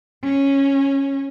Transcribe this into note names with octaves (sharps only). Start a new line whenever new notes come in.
C#4